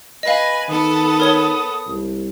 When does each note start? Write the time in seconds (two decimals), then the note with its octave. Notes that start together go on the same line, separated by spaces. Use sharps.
0.23 B4 D#5 F5 G#5 A#6
0.69 D#3 B3 A4 D#6
1.20 A#4 C#5 G7
1.87 C2